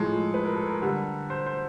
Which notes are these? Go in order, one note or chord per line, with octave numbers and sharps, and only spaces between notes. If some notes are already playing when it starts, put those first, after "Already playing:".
Already playing: A2 F3 G#3 A4
B4
A#4
A4
A#4
D3 G3
C5
C5